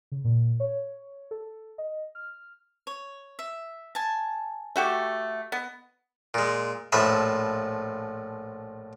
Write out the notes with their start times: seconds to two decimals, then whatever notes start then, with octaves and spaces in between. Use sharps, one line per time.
0.12 C#3
0.24 A#2
0.60 C#5
1.31 A4
1.78 D#5
2.15 F6
2.87 C#5
3.39 E5
3.95 G#5 A5
4.76 A3 F#4 G4
5.52 B3 D#5
6.34 A#2 G#3
6.92 A#1 A2 F3 B4 E5 D#6